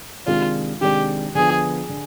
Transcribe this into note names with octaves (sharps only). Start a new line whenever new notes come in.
C3 D#3 G#3 D4 F4
C3 D#3 G#3 D4 G4
D3 F3 B3 G#4
D3